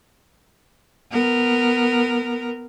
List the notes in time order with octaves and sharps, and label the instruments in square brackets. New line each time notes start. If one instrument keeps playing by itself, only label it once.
[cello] B3 A#4